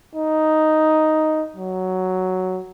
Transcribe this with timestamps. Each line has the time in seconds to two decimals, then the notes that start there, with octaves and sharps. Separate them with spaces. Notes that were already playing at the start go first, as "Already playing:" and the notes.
0.15 D#4
1.56 F#3